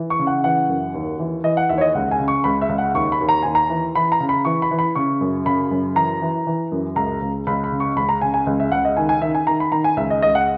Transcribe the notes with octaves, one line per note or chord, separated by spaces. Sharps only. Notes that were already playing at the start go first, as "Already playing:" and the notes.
Already playing: E3
C#6
C#3
F#5
E3 F#5
F#2
D#2
E3
E3 D#5
F#5
D#2 E5
C#5
D#5
C#2 F#5
G#5
C#3
C#6
C#2 B5
E5
C#2
F#5
D#2 C#6
B5
D#2
A#5
D#2 G#5
A#5
E3
E3 B5
A#5
C#3
B5
E3 C#6
B5
E3
B5
C#3 C#6
F#2
C#3 B5
F#2
E3 A#5
E3
E3
F#2
C#2 A#5
C#2
C#2 B5
B5
C#3
C#6
C#2 B5
A#5
C#3 G#5
G#5
C#2 D#5
E5
C#2 F#5
D#5
D#3 G#5
G#5
D#3 E5
G#5
D#3 A#5
B5
D#3 A#5
G#5
C#2 E5
D#5
C#2 D#5
F#5